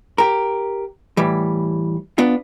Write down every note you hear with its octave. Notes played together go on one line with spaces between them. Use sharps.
G4 A#4
A2 E3 G3
B3 D4 F4